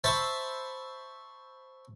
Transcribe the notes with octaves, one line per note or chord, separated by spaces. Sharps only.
C5 E5 A5 B5 C#6